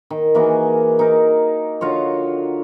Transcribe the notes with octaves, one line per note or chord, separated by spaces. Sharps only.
D#3
E3 A#3 F#4 G#4
D#4 A#4
D3 F4 F#4 C#5